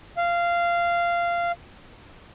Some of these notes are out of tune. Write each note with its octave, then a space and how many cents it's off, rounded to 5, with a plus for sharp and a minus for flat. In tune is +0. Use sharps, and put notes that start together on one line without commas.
F5 -15